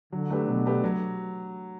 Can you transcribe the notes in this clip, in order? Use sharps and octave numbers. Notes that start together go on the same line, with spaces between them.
D3 F#3
A3 D4 G4 B4
B2 F#3
A3 D4 G4 B4
F#3